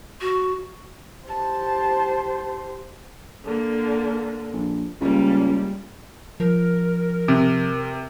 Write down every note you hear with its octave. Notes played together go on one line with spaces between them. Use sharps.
F#4
G4 C5 A5
D3 A#3
A#1
C#2 G3 A#3
F3 A#4
C3